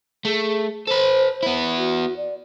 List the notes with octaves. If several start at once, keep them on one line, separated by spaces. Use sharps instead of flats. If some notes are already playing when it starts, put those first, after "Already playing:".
A3 G#4
A4 B4 C5
B3 E4
F#4
D5